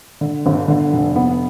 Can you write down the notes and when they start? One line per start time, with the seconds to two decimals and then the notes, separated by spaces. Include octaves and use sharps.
0.21 D3
0.46 G1
0.68 D3
0.93 F1
1.16 B3